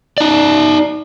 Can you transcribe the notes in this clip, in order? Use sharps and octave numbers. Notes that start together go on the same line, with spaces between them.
D#4 D5